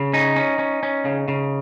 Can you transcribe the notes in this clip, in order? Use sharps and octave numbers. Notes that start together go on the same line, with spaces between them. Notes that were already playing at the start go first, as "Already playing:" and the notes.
Already playing: C#3
C#4 D#4
C#4
C#4
C#4
C#3
C#3